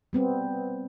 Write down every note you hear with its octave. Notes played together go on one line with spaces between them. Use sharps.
G3 B3 C4